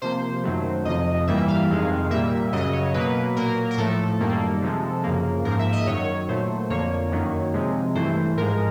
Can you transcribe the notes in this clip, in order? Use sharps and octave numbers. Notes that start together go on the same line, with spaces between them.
C3 F3 A#3 C5
F#2 D#3 F#3 A3
F2 C3 F3 D#5
G2 E3 G3 A#3 E5
F5
F2 C3 D#3 G#3
A#2 G3 A#3 E5
F#2 C#3 F#3 D#5
C#5
B2 F#3 A#3 B4
A#2 F#3 A#3 A#4
A#4
A2 F3 A3 A4
F#2 D#3 G3 A#3
C3 F3 G#3
F#2 C#3 F3 A#3
G#2 F3 A#3 A#4
E5
D#5
F#2 D#3 F#3 C#5
A#2 F#3 A3 C5
F2 D3 F3 A#3 C#5
F#2 D#3 F#3 A#3
C3 F3 G#3
G2 E3 A3 C5
G#2 F3 G#3 A#4